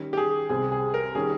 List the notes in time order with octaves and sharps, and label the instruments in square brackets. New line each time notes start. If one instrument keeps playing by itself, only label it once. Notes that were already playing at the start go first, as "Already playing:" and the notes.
Already playing: [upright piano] D#3 G3 C#4
[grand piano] G4
G#4
[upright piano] C2 C3 G3 C4 [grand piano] G#4
[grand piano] G#4
A#4
[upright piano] D#3 G3 C#4 [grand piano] G#4